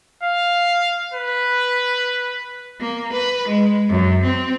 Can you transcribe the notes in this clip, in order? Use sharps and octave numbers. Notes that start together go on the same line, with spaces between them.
F5
B4
A#3
B4
G#3
F#2
C4